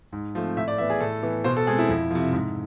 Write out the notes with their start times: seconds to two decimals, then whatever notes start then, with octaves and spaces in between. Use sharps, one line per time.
0.13 G#2
0.35 F3 A3 C4
0.56 A2 E5
0.68 D5
0.78 E3 B3 E5
0.90 G#4
1.00 A2 A4
1.23 E3 B3
1.44 B2 C5
1.57 A4
1.67 G#3 C4 G#4
1.78 E4
1.89 F2
2.11 C3 F3
2.33 G#2